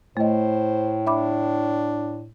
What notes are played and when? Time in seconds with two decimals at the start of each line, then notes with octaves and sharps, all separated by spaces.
0.17 A2 A3 C5 D#5
1.07 D4 E5 B5 D6